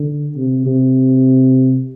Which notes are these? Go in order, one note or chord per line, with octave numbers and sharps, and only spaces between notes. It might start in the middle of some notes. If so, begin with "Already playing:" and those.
Already playing: D3
C3
C3